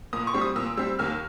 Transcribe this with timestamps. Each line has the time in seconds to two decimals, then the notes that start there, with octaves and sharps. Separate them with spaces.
0.13 A#2 D#6
0.27 C#6
0.34 G3 C4
0.41 D#6
0.56 A#2 E6
0.77 G3 C4 E6
0.99 D#2 F6